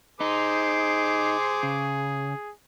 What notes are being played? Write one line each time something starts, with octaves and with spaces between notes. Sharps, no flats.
D#4 G#4 C5 D6
C#3